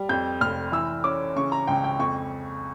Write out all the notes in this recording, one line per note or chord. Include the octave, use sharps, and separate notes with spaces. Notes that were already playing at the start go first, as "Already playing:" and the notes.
Already playing: G3
F2 G6
F1 F6
E3 E6
C#4 D6
C#3 C#6
A#5
C#2 G5
G5
F2 C#6